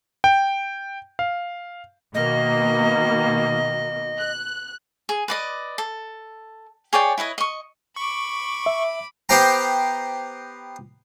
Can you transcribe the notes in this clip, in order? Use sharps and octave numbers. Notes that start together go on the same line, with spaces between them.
G5
F5
B2 D#3 A#3 D#5
F#6
G#4
B4 D5 D#5
A4
G#4 C#5 D5 G5
E4 B4 C#5 D#5
D#5 C#6
B5 C#6 D6
E5
B3 G4 C5 G5 A#5